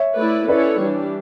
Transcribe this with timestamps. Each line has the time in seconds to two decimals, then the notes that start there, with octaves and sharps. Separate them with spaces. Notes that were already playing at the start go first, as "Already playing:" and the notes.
Already playing: C#5 E5
0.16 A3 E4 B4 D5
0.48 C#4 E4 A4 B4 C#5 D5
0.81 E3 G3 D4